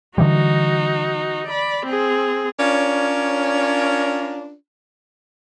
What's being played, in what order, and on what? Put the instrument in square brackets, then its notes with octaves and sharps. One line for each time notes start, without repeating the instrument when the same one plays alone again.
[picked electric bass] D3 E3 G3 [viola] D#4 F#4
[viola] D5 B5
C4 G#4
[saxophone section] C#4 D4 F4 A#4 C#5 D5